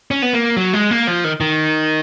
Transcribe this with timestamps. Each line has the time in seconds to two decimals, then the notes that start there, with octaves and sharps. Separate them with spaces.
0.11 C#4
0.22 B3
0.33 A#3
0.57 F#3
0.73 G#3
0.91 A#3
1.07 F3
1.24 D#3
1.41 D#3